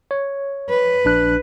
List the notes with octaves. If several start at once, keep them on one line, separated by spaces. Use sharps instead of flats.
C#5
B4
A#1 D4 F#6